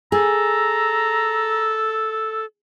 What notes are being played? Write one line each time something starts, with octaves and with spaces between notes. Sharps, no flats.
G#4 A4 A#5 E6